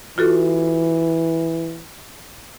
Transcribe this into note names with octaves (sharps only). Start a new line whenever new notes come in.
E3 F4 F#4 A4